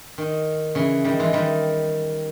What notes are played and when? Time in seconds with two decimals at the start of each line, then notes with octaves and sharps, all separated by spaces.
0.18 D#3
0.75 C#3 E3
1.04 D#3 G3
1.19 E3 G#3
1.33 D#3 G3